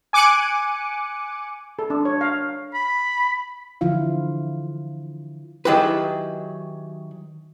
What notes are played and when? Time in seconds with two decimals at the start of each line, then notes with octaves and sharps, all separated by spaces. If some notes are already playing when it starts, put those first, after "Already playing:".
0.13 G#5 D6 F#6 C#7 D#7
1.79 A4
1.90 D4
2.05 C#5
2.21 F5
2.74 B5
3.81 D3 E3 F3 E4 F4 F5
5.65 D#3 F#3 E4 G4 G#4 B4